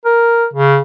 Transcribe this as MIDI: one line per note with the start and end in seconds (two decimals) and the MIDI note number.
0.05 0.46 70
0.53 0.80 49